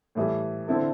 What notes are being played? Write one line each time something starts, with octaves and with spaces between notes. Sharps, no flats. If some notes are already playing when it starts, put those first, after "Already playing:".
A2 E3 G3
D3 C4 E4 A4